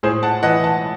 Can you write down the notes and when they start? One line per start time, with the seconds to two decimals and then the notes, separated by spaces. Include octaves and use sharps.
0.03 A2 G#4 C5
0.23 F#5 A5
0.43 E3 D#5 F#5
0.64 F#5 A5